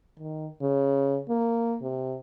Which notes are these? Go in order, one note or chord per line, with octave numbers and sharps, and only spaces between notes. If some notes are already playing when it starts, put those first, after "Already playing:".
D#3
C#3
A#3
C3